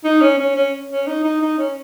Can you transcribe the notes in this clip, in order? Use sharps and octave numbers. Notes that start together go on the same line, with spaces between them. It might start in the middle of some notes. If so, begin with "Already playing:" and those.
D#4
C#4
C#4
C#4
C#4
D#4
D#4
D#4
C#4